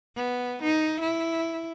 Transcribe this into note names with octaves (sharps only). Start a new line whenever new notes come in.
B3
D#4
E4